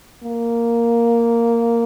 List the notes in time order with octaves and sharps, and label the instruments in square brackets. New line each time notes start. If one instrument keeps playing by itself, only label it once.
[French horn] A#3